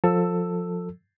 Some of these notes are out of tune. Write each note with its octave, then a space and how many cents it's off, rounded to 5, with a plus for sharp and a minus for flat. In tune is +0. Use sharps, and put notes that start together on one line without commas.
F3 +20 A4 +15 E6 +5